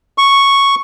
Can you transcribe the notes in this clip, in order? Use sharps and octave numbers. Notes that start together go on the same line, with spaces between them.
C#6